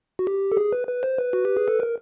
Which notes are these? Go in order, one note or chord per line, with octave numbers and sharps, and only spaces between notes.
F#4
G4
A4
G#4
B4
B4
C5
B4
F#4
G4
G#4
A4
A#4